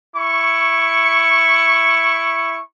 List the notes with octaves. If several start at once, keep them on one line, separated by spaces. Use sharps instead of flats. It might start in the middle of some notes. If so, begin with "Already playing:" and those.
E4 C#6